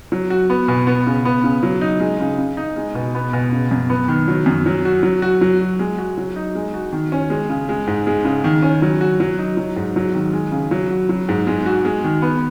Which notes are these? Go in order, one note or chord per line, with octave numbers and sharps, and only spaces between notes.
F#3
F#4
B3
B2
B3
C#3
B3
C#3
F#3
D#4
G#3
C#3
C#3
D#4
G#3
B2
B3
B2
C#3
F#2
B3
D#3
F#3
F#2
F#3
F#4
F#3
F#4
F#3
F#4
G#3
F#4
F#3
D#4
G#3
F#4
D#3
C#4
G#3
C#3
G#3
G#2
G#3
C#3
D#3
C#4
F#3
F#4
F#3
D#4
F#3
G#2
F#3
D#3
G#3
C#3
F#3
F#4
F#3
G#2
G#3
F#4
G#3
D#3
B3